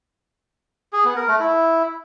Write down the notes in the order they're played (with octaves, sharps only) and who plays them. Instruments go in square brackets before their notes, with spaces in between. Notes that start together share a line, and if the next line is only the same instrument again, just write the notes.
[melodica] G#4
B3
A#4
A3
E4